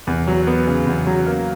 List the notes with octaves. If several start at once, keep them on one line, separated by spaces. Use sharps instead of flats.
E2
F#3
B3
C#3
E2
F#3
A#3